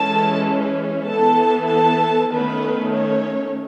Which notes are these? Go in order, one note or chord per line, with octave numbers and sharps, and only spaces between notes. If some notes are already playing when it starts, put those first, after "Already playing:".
Already playing: E3 G#3 C#4 A4 A5
E3 B3 A4 A5
A4 A5
D#3 A3 B3 C#4 B4
C#4 C#5